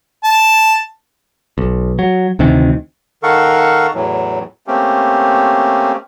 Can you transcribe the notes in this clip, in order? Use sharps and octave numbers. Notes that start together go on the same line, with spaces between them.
A5
B1
F#3
D2 C3 D#3 E3
D#3 A4 A#4 F5 F#5 C#6
E2 A2 E3 F#3
A3 A#3 C4 C#4 G4